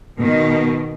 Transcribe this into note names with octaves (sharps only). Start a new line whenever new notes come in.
B2 D#3